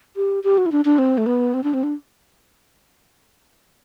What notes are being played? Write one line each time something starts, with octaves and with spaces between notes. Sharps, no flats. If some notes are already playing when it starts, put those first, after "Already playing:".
G4
G4
F#4
E4
D4
D4
C4
A3
B3
C4
D4
C4
D4